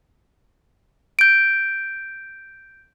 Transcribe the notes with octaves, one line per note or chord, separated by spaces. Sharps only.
G6 D7